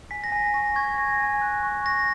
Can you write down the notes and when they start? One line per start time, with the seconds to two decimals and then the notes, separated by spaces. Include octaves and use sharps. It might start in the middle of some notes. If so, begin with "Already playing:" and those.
0.11 G#5 B6
0.24 A#6
0.32 G#5 B6
0.54 C#6 A#6
0.76 C#6 G#6
0.98 G#5 A#6
1.20 G#5
1.42 F#6
1.63 C#6
1.86 F#6 A#6